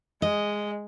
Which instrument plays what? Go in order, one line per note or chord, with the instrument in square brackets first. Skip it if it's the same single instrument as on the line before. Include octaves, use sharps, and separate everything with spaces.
[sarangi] G#3 [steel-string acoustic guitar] D#5